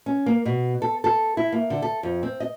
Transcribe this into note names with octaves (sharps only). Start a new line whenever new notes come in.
C#4
A#3
B2
A4
A4
E4
A#3
D3
A4
F2
C4
D#5